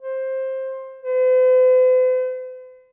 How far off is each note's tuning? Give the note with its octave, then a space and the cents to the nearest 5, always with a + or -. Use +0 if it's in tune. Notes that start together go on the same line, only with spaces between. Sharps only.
C5 +15
C5 -45